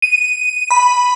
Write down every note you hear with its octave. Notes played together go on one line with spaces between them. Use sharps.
D#7
B5